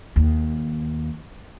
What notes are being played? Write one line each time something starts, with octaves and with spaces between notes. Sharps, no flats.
D#2